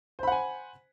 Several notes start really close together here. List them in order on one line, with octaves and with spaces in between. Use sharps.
C5 B5 F#5 G#5